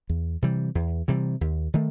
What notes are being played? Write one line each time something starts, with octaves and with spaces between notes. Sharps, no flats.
E2
C3 E3 G3
E2
C3 E3 G3
D#2
D#3 A3